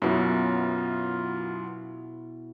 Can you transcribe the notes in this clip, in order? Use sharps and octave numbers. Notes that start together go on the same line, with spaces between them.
F#2 B2 F#3 B3 E4 F4